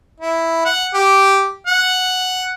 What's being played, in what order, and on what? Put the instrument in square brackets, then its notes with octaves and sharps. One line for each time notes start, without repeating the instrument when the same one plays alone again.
[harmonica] E4
F#5
G4
F#5